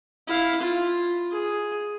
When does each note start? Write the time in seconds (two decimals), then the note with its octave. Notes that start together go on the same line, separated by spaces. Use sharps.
0.27 E4 F5
0.60 F4
1.31 G#4